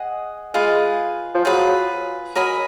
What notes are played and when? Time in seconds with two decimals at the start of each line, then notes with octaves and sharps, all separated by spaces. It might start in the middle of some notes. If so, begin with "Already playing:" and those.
Already playing: G#4 D#5 F#5
0.54 G#3 F4 G#4 B4
1.34 F3
1.45 F#3 F4 G#4 B4
2.35 F#3 A#4 D#5 G#5 B5